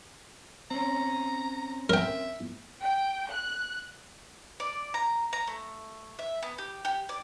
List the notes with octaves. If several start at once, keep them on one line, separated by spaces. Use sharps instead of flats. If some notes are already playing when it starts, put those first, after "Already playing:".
C4 C#4 A#5
A#4 E5 G5
G5
F#6
D5
A#5
A#5
A3
E5
B3
G4
G4
D5